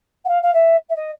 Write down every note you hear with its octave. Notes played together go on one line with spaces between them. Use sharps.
F#5
F5
F5
E5
E5
D#5